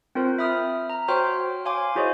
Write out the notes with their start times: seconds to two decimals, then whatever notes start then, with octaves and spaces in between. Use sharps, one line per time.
0.15 C4 F4 A#4 C5
0.38 E5 B5 D#6 F6
0.90 A#5
1.08 F#4 C5 C#5 G5 C6 F6
1.65 C#5 F5 G#5 C6 D6
1.95 E4 F#4 G#4 C5 C#5 D#5